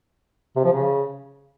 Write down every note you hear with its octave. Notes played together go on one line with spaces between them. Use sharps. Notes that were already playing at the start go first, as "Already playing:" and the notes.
C3
F3
C#3